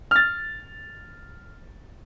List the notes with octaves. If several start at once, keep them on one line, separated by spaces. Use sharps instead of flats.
F6 A6